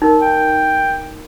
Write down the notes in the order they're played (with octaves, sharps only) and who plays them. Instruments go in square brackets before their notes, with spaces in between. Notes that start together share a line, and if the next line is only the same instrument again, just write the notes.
[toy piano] D#4 A#4
[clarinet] G5